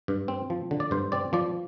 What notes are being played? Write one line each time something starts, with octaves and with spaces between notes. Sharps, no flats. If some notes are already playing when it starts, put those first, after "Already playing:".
G2
C4
F3
D3
D5
G2 C5
C4 D5
F3 D5